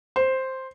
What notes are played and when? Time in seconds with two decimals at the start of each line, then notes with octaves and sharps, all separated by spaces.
0.16 C5